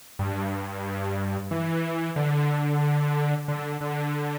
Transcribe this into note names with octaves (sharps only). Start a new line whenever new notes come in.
G2
E3
D3
D3
D3